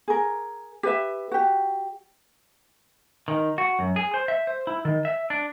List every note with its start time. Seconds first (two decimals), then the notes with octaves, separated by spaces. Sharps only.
0.08 G#4 A#4
0.83 G4 B4 E5
1.31 F#4 G4
3.28 D#3
3.58 F#4
3.79 F#2
3.96 G#4
4.14 C5
4.28 E5
4.47 C5
4.67 E4
4.85 D#3
5.05 E5
5.30 D4